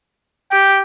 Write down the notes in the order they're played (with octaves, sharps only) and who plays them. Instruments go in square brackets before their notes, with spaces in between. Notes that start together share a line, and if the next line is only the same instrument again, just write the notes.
[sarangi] G4 [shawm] G5